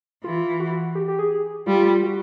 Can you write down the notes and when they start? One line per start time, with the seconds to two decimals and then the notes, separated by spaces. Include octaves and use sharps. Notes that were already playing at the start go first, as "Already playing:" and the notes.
0.24 E3 F4
0.60 F#4
0.95 G4
1.08 G4
1.19 G#4
1.67 G3 F4
2.03 F#4